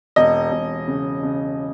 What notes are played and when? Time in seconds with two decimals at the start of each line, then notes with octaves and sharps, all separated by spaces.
0.16 E1 D#5
0.51 E1
0.88 C#3
1.23 C#3